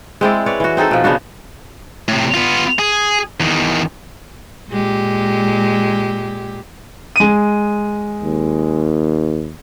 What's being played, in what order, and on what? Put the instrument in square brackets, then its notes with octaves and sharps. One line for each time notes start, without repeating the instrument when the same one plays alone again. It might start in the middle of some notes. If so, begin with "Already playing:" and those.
[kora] G#3 C4 E4 D5
B4 C#5 D5
E3 F#4
C4 D#4 G#4 A4
B2 F3
C#3 B3 D4 F#4
[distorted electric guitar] A2 C3
B3 F4
G#4
E2 D#3
[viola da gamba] A#2 G#3 G4
[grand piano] G#3 D#7
[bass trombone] D#2